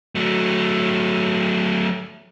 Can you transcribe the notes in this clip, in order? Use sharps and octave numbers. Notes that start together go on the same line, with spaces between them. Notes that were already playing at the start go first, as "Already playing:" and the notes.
F#3 A3